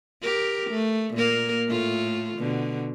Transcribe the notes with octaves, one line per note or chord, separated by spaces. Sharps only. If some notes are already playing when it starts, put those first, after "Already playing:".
G4 A#4
A3
A#2 A#3 A#4
A2 A3 F4
B2 D3